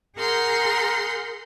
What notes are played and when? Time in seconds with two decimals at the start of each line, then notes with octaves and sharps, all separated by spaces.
0.17 G#4 A#4 F#5 A#5 C6 G6